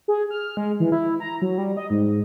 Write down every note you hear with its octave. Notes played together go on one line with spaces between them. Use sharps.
G#4
F6
G#3
E3
E4
A#5
F#3
G3
D#5
G#2